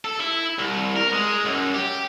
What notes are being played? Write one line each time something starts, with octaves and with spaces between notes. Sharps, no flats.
A4
E4
C2
A#4
G#3
F#2
G4